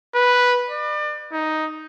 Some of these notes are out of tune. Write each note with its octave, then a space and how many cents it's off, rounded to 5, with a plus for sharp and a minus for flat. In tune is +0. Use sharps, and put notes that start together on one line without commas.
B4 -5
D5 +35
D#4 +5